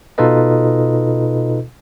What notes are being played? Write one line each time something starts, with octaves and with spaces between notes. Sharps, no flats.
B2 D#4 F4 A4 B4 D#5